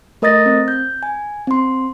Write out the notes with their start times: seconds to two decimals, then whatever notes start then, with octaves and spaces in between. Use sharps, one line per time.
0.22 A3 A#4 D#5 D#6 A6 A#6
0.46 C4
0.68 G6
1.03 G#5
1.47 C4 C6